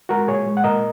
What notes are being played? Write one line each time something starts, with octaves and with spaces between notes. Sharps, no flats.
G#3 F#4 A#4
A#2 G#4 C#5
G#3
F#5
A#2 A#4 D#5